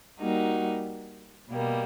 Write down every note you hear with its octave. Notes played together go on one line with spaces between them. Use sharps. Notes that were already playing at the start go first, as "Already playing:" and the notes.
G3 A#3 D#4 F#4
B2 G3 A#3